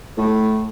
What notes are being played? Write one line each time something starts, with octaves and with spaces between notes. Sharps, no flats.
A2